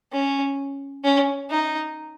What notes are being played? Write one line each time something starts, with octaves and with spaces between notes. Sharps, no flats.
C#4
C#4
D#4